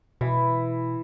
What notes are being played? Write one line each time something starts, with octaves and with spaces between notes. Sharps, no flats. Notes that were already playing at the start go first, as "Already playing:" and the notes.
B2 E3